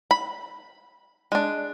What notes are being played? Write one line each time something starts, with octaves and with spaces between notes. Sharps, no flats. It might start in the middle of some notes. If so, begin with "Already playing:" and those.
B5
G#3 D4